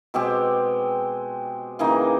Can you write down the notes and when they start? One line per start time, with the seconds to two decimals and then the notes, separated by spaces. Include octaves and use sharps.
0.14 B2 G#3 C4 G4
1.79 C#3 E3 A#3 D#4